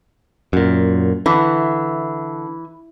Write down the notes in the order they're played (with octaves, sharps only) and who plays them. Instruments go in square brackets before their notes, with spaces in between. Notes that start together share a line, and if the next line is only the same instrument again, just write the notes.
[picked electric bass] F#2 A#2
[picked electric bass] D3 [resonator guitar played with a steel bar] E3